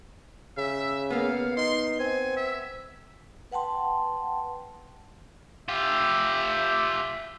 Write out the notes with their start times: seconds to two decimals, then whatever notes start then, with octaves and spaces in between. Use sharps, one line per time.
0.57 C#3 E5
1.10 A#3 B3 F5
1.57 D#4 C6
2.00 C4 G#5
2.37 E5
3.51 B4 F#5 G5 A5 C6
5.68 F4 G4 E5